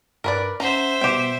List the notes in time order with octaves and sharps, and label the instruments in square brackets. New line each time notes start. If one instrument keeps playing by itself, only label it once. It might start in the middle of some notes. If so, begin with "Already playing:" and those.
[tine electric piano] G2 F#6 [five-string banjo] A#4 B4 D5
[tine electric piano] C#4 F#5 [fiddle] C5 E5 [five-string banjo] A#5
[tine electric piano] B2 G3 B3 [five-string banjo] G4 G5